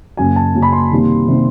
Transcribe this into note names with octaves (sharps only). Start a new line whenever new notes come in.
F#2 C#3 F#3 A#3 G#5
A5
F#2 C#3 F#3 A#3
B5
C6
C3 D#3 G3 A#3
C3 D#3 G3 A#3